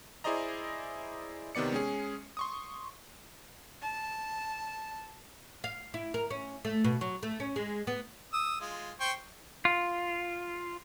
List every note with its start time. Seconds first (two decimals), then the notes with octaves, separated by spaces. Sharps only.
0.24 E4 G#4 C5 D5 D#5 A#5
1.55 C3 D#3 B3 D5 C#7
1.72 G#3 C#4 G#4
2.37 C6 C#6 D#6
3.81 A5
5.64 F5
5.94 E4
6.14 A#4
6.30 C#4
6.65 A3
6.84 B2
7.01 F#3
7.23 A3
7.40 C#4
7.56 G#3
7.87 B3
8.34 D#6 E6
8.61 G#3 F4
9.00 C5 G5 C#6
9.65 F4